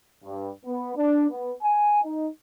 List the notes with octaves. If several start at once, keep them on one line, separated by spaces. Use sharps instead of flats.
G2
B3
D4
B3
G#5
D#4